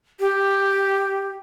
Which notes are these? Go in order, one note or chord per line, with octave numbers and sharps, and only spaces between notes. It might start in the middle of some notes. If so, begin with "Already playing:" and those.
G4